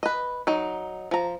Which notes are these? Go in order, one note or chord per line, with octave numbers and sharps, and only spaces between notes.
B4 D#5
F#3 D#4
F3 A#5